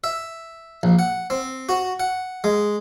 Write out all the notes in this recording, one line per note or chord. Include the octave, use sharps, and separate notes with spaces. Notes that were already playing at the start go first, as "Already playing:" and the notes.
E5
A#1
F#5
C4
F#4
F#5
G#3